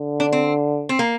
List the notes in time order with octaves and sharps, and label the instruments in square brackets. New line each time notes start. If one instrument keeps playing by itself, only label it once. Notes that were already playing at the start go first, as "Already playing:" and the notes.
Already playing: [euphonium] D3
[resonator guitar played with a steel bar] D4
C4
C4
A#3